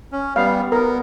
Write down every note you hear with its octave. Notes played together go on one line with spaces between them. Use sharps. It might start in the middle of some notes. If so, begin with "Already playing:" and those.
C#4
G3 B3 F5
B3 A#4